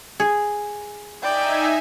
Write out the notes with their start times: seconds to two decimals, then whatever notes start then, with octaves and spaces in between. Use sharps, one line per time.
0.20 G#4
1.23 D#4 D5 E5 G5 G#5